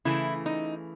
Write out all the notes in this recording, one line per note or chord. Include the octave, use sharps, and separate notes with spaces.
C#3 E3 A3 E4
D#4